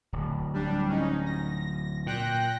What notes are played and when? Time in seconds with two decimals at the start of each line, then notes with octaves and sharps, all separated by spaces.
0.12 D1
0.54 G3 D4
0.89 C#4 D#4
1.26 A#6
2.06 A#2 G5 F#6 A#6